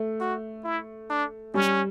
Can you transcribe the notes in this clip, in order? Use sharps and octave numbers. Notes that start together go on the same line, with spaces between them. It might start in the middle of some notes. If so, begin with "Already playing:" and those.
Already playing: A3
F#4
E4
D4
G3 C#4